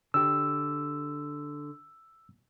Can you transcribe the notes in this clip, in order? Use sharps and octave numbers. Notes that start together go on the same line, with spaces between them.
D3 G4 E6